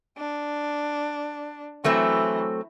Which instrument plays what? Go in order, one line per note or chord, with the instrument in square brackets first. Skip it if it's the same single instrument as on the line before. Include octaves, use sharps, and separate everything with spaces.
[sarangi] D4
[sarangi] E3 [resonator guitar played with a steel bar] F#3 A3 C4